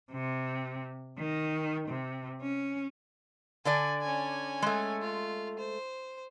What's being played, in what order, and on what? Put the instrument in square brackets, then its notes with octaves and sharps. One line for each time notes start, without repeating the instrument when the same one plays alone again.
[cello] C3
D#3
C3
C#4
[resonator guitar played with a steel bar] D3 D4 D5 [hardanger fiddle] G#5
[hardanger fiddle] C#4 G#5
[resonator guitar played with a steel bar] G#3 A3
[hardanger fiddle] F4
C5